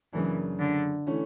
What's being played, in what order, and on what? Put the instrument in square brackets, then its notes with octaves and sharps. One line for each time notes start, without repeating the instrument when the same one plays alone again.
[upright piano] F#2 C#3 F#3 A#3 D4 [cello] E3
[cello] D3
[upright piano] E3 A3 C#4